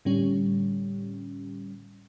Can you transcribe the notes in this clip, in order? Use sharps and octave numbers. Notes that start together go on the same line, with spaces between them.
A2 D3 G3 C#4